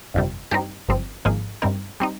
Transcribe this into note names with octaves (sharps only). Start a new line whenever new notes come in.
G1 F2 C3 G3
G2 G3 C4 D#4 G4
G1 G2 F3 C4
G#1 G#2 F3 A#3 D#4 G#4
G2 G3 C4 D#4 A#4
G3 C4 D#4